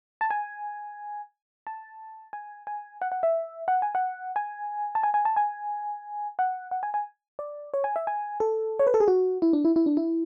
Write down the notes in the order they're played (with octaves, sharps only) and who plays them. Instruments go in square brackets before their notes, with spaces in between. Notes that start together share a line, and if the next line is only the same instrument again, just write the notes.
[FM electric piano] A5
G#5
A5
G#5
G#5
F#5
F#5
E5
F#5
G#5
F#5
G#5
A5
G#5
G#5
A5
G#5
F#5
F#5
G#5
G#5
D5
C#5
G#5
E5
G#5
A4
C#5
B4
A4
G#4
F#4
E4
D4
E4
E4
D4
E4